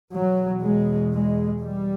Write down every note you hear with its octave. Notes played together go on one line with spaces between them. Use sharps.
E2 B2 F#3
G#3
G#3
G3